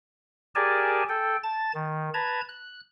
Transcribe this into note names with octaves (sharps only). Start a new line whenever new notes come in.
G4 G#4 A#4 D5 G#5 A5
A4 G5
A5 A6
D#3
B4 A5 A#5 G#6
F#6